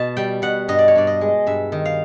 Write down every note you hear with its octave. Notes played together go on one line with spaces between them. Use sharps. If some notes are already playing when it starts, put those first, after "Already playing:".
Already playing: B2 A5
G3 G5
B2 F#5
G2 D#5
D5
C#5
G2 D5
D#5
G#3
G2 E5
D#3
F5